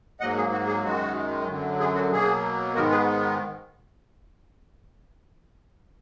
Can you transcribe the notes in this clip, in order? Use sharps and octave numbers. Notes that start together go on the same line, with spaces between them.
G#2 F#3 A#3 D#5 F#5
G#4
F#4
G#4
F#2 D#3 G#3 F#4
F#2 D3 F#3
G#4
F#4
B2 F#3 A#3 G#4
G#2 D#3 G#3 B3 F#4 A#4
G#4 B4